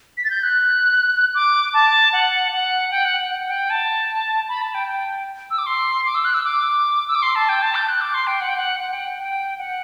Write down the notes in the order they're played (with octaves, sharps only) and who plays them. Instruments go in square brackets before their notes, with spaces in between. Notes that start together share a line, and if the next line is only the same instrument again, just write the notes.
[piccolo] B6
A6
G6
F#6
D6
A5
F#5
F#5
G5
F#5
F#5
G5
A5
B5
A5
G5
G5
E6
D6
C6
D6
E6
F#6
E6
D6
E6
D6
C6
A5
G5
A5
G6
F#6
D6
C6
G5
F#5
G5
F#5
F#5
G5
G5
F#5